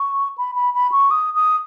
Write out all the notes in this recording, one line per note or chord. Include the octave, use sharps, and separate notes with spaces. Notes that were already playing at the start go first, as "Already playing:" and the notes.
Already playing: C#6
B5
B5
B5
C#6
D#6
D#6